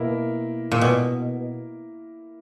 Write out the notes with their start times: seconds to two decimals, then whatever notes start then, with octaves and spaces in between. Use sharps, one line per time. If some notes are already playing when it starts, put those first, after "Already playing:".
Already playing: B2 A#3 E4 A#4
0.72 A#2
0.81 B2